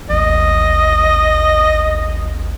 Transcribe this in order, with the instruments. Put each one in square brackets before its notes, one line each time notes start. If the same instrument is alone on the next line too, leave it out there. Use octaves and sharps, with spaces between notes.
[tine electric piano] A1 D#2 [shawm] D#5